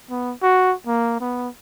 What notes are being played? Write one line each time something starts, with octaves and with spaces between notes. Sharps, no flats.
B3
F#4
A#3
B3